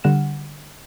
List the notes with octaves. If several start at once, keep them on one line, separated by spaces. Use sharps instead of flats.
D3 G3 F#5 F6 A#6 E7